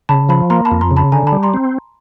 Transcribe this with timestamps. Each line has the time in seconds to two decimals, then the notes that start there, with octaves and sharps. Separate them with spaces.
0.09 C#3 A5 B5
0.29 F3 A5 B5
0.50 A#3 A#5 C6
0.65 A5 B5
0.71 F2
0.81 A#5 C6
0.91 C#3
0.96 A5 B5
1.12 D3 G#5 A#5
1.27 A5 B5
1.32 G3
1.43 A#5 C6
1.54 C4